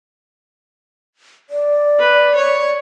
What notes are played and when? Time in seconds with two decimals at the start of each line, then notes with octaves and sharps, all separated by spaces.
1.50 D5
1.99 B4
2.35 C#5